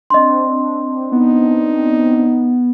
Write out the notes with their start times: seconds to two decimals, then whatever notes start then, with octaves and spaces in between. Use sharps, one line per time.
0.10 C4 D4 D#5 C6
1.12 B3 D#4